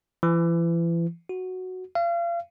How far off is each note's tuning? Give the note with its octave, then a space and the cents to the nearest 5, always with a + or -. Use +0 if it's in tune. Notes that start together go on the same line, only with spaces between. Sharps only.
E3 +35
F#4 +0
F5 -35